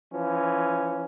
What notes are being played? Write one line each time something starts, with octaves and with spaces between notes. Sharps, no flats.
E3 F3 C#4